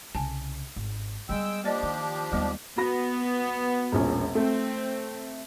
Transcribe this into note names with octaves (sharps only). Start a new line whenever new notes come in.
C2 C#3 G#5 A5
G#1
G3 G#3 B3 G5 E6
F3 A#3 D4 G4 D5 D#5
D#3
D#2 G3 G#3 B3 D#5
B3 F#4 B5 A#6
E1 A#1 C#4
A3 C4